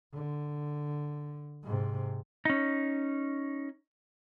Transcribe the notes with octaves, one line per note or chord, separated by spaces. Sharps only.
D3
G#2 C3
C#4 D#4